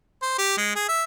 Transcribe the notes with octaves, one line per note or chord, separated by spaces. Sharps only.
C5
G4
G#3
G#4
E5